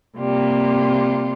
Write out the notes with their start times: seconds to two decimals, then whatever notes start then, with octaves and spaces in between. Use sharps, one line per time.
0.17 C3 G3 A#3 F4